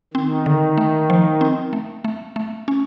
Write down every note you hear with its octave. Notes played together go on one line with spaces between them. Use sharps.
D#3 C4
D3
A3
F3
C4
A3
A3
A3
C#4